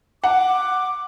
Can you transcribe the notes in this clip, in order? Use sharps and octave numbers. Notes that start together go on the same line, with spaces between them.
F#5 D6